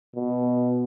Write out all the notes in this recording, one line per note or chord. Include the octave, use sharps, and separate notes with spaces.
B2